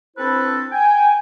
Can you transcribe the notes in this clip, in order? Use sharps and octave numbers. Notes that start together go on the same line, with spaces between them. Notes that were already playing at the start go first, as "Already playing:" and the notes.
C4 D4 E4 A4 B4 C5
G5 G#5